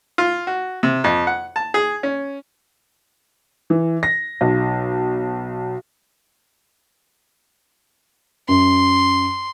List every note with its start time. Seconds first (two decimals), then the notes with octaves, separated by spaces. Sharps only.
0.18 F4
0.47 F#4
0.83 C3
1.04 F2
1.27 F#5
1.56 A5
1.74 G#4
2.03 C#4
3.70 E3
4.03 A#6
4.41 B1
8.49 F#2 C6